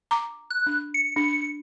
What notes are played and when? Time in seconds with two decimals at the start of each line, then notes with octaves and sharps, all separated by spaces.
0.11 A#5 D6
0.50 F#6
0.67 D4
0.94 C#7
1.16 D4